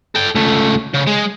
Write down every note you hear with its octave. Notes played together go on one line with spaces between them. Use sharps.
A4 G5
C#2 A3
C#3
G#3